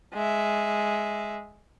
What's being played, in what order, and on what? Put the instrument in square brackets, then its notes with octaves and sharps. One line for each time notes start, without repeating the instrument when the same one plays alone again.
[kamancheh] G#3 E5